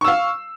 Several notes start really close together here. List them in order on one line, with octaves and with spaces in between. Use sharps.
C#6 E6 F5